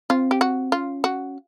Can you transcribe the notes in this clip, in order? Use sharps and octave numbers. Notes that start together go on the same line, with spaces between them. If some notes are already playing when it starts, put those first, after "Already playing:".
C4 F4
G4
F#4
C#4 F4
F#4